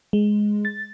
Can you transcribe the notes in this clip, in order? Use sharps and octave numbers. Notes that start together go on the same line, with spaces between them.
G#3
A6